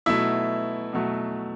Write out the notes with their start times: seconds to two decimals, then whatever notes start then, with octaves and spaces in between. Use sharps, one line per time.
0.06 B2 F#3 A3 E4 E5
0.93 B2 F#3 A3